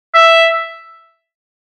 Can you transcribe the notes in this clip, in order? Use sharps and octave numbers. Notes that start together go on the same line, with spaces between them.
E5